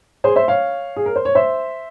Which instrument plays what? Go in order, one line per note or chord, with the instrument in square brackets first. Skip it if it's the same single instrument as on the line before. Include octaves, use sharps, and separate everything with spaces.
[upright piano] G#4 C5
C5 E5
C#5 F5
G#4
A#4
C5
C#5
C5 E5